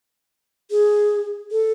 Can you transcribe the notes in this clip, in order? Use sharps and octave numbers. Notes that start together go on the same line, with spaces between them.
G#4
A4